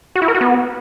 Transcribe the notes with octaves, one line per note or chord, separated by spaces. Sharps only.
F#4
E4
A#4
F#4
B3